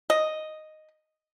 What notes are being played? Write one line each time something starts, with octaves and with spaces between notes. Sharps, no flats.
D#5